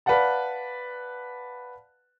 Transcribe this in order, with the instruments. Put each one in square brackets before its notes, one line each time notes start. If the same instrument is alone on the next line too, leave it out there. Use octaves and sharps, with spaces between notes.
[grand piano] B4 D5 F5 F#5 A5